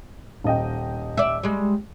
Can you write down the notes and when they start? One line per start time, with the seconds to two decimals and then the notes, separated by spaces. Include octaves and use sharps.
0.44 D#1 D#5 G5
1.17 D5 E5
1.44 G3 G#3